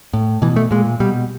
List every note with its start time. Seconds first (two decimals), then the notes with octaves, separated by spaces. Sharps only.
0.13 A2
0.42 B2 E3
0.56 A3
0.71 A#2 G#3
1.00 B2 G3